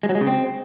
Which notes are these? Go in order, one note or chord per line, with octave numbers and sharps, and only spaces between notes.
G#3
F#3
G#3
C#3
C4